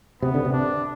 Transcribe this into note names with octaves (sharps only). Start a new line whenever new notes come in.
C3 B3
D3
C3
D4